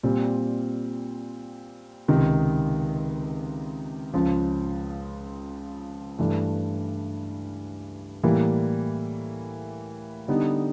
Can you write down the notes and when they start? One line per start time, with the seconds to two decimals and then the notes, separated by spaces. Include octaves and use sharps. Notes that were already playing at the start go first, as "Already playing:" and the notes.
0.03 A#2 G3 C4
2.08 C#2 C3 D#3
4.14 C#2 C#3 F3
6.19 G2 E3 A3
8.23 A2 E3 G3 A#3
10.28 D3 G3 B3 D#4